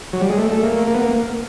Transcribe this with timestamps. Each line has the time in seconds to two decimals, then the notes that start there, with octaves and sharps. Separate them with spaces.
0.13 F#3
0.21 G3
0.30 G#3
0.39 A3
0.51 A3
0.63 A#3
0.87 A#3
0.95 B3
1.02 A#3